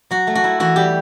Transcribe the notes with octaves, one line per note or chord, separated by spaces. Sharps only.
F#3 F#4
A3
F#4
E4
E3 F#4
G3 G4